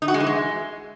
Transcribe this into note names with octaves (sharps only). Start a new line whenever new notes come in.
D#4
F#4
G#3
E3
G#3